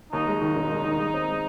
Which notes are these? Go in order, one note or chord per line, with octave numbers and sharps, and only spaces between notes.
D#2 D#4
G#3
D#3
E1
G#3
D#3
G#3
C4
G#3